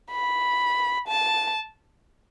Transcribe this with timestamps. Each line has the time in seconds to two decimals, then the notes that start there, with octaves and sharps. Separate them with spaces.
0.11 B5
1.08 A5